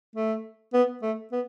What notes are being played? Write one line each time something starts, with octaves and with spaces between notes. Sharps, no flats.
A3
B3
A3
B3